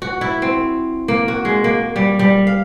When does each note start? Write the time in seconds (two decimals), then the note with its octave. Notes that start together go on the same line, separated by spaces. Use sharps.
0.02 F#4
0.21 E4
0.42 C4
1.08 A#3
1.28 F#4
1.45 G#3
1.64 A#3
1.96 G3
2.19 G3
2.47 F5